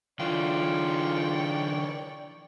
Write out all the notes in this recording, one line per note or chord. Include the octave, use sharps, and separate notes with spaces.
D3 E3 F4 C#5 D5 G5